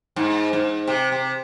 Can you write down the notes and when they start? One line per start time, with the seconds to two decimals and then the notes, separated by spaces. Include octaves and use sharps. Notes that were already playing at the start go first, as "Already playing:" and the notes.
0.16 G#2
0.53 G#2
0.88 C3
1.12 C3